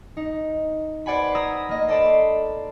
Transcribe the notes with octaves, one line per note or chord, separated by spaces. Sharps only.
D#4
B4 C5 D5 F#5 G#5 B5
A#5 B5 D#6 E6 G#6 A#6
A#3 D#5
A4 C5 D5 A5 B5